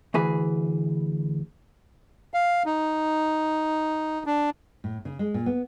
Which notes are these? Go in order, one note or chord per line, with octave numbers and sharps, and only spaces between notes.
D2 E3 G#4 B4
F5
D#4
D4
A2
C#3
G#3
A#2
B3